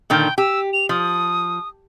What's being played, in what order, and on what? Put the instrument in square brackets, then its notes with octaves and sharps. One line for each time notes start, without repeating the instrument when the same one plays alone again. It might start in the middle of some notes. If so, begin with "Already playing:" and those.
[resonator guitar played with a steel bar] A#2 D3 D#3 [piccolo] G5
[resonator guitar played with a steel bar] G4 [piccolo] E6
[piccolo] F7
[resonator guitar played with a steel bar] F3 [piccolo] D#6